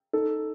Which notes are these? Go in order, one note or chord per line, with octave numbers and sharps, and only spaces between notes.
D#4 A4